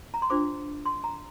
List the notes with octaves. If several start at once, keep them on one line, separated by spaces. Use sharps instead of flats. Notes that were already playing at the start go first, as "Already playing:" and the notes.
A#5
C6
D4 F4 C5 D6
C6
A#5